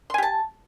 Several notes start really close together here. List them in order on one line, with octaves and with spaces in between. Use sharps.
C6 G#5 G4 A5